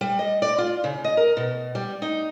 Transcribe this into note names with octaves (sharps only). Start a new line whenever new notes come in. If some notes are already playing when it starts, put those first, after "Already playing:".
G3
D#5
D5
F4
C#3
D#5
A#4
B2
G3
D#4